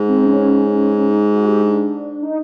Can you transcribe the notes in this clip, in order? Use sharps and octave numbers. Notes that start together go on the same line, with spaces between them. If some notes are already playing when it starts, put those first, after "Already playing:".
Already playing: G#2
C4
C#4
D#4
F#4
G4
D4
D#4